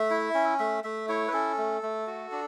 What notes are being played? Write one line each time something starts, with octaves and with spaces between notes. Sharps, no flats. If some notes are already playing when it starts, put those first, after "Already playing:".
Already playing: A3 E5
E4
C#4
A3 E5
A3 E5
E4 C#5
B4
C#4 A4
A3
A3
F#4
D4